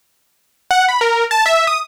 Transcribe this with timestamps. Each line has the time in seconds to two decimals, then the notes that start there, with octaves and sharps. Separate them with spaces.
0.71 F#5
0.89 B5
1.01 A#4
1.31 A5
1.46 E5
1.67 D#6